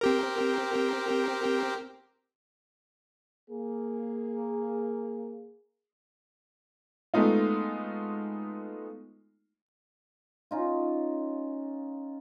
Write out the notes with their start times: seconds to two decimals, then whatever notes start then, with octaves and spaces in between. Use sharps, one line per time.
0.01 C4 G4 A#4
3.51 A#3 G#4
7.14 G#3 A3 B3 D#4 F4
10.51 C#4 D#4 F4